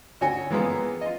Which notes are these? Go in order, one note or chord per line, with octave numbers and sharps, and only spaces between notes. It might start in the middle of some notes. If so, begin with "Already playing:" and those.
D2 F#4 C#5 G5 G#5
E3 G#3 A#3 B3 F4
F4 D#5